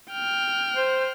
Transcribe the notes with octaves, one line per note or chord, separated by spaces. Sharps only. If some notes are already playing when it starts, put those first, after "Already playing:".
G5 F6
C5